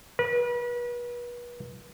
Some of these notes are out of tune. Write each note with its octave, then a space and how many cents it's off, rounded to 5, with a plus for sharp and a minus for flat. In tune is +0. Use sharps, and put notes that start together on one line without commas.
B4 -35